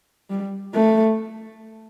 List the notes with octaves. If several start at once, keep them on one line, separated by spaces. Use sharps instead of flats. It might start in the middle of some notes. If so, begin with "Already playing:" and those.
G3
A3